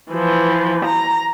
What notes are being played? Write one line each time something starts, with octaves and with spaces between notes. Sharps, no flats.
E3 F3
A#5